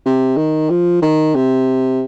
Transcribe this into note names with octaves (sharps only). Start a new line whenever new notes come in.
C3
D#3
F3
D#3
C3